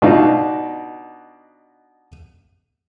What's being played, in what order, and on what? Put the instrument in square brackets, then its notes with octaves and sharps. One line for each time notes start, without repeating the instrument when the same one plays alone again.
[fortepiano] B2 D4 D#4 F4 F#4